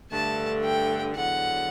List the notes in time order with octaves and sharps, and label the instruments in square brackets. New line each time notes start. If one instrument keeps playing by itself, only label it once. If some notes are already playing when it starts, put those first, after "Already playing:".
[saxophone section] G2 D3 A3 [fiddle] A5
[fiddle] G5
[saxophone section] E2 D3 F#3 [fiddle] F#5